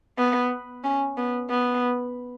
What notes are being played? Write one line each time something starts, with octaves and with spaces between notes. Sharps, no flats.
B3
C#4
B3
B3